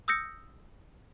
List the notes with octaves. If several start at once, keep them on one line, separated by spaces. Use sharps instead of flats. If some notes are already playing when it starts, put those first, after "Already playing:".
D#6 E6 G6 A#6 C#7